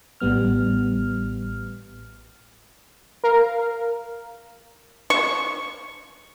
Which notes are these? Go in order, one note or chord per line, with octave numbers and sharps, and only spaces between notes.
A1 A2 G3 B3 F6
A#4 F5
C#6